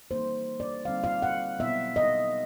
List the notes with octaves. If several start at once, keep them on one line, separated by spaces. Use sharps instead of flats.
E3 G3 A#3 D#4 C5
D5
D3 G3 C4 D#4 F5
F5
F#5
B2 F#3 B3 E5
D#5